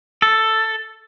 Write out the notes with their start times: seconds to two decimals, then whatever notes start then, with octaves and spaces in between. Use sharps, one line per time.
0.22 A4